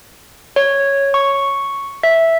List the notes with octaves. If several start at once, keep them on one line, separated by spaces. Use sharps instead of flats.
C#5
C#6
E5